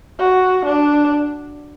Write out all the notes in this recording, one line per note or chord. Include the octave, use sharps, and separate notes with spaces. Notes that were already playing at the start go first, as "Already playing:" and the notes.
F#4
D4